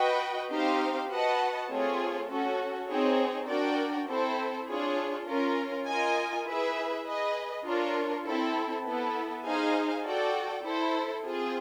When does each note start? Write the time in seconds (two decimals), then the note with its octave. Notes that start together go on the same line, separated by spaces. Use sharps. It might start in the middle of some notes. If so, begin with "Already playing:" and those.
Already playing: F#4 B4 D#5 G5
0.50 C4 D#4 G4 C5 F5
1.09 F#4 B4 D#5 F#5 A5
1.70 A3 C4 F4 G#4 C#5
2.29 C#4 F#4 A4
2.89 C4 D#4 G#4 C#5
3.48 D4 F#4 A#4 D5 G5
4.08 C4 E4 A4 C5
4.67 D4 F4 G#4 C#5
5.27 C#4 F4 A#4
5.86 F4 A#4 D#5 G#5
6.46 E4 G#4 B4 E5
7.05 G#4 B4 D#5
7.65 D4 F4 A#4 C#5
8.25 C4 E4 A4
8.85 B3 E4 A4
9.44 D#4 G#4 C5 F5 G#5
10.04 F#4 A4 D5 G5
10.63 E4 A4 C5
11.22 C4 F4 G#4